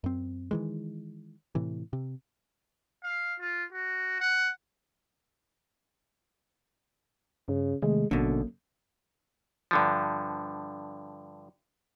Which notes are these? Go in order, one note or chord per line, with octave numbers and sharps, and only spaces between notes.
F#2 C4
D#3 E3 G#3
A2 C3 E3
C3
F5
F4
F#4
F#5
G2 C#3
C3 D#3 G#3 A3
A1 F#2 B2 D3 A#3
G2 D3 F3